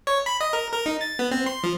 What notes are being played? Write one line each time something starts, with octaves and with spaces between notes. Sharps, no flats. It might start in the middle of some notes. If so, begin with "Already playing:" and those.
C#5
B5
D#5
A#4
A#4
D#4
A6
B3
C4
C6
F3